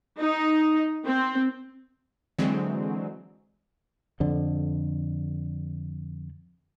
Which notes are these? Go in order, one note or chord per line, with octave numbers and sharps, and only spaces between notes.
D#4
C4
D3 E3 F#3 G#3 C4
F2 D3